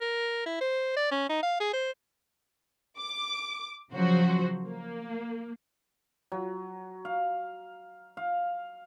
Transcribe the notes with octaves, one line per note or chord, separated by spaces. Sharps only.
A#4
E4
C5
D5
C#4
D#4
F5
G#4
C5
D6
C#3 F3 F#3 F#4 C5
A#3
F#3
F5
F5